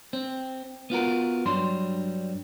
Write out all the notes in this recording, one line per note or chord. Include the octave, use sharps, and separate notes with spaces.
C4
B3 F4 F#4 A#4
G2 F#3 G3 C6